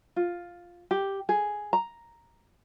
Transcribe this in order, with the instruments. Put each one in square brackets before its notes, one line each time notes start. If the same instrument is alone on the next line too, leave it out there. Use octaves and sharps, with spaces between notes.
[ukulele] F4
G4
G#4
A#5